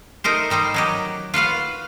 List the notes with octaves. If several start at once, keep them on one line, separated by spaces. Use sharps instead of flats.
A3 D#4 A#4 C5
D#3 G3 D#4 C5
F#3 D#4 G4
F4 F#4 B4 F5